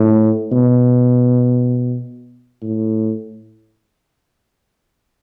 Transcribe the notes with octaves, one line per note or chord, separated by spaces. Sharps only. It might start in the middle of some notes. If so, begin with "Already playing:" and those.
Already playing: A2
B2
A2